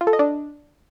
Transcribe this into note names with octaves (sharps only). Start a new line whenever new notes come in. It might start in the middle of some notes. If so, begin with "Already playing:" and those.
F4
A4
D#5
D4